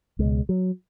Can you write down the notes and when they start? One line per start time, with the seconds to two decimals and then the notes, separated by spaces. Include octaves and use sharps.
0.19 C#2 B2 G#3
0.49 F#3